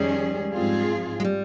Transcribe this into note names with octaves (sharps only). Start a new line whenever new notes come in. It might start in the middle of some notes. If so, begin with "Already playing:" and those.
Already playing: F2 D#3 G3 G#3 C#4 G#4
G#2 F3 C4 F4 G#4
G#3
G3